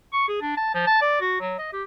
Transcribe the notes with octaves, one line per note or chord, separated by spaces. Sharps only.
C#6
G#4
D4
A5
F3
A5
D5
F#4
F#3
D#5
G4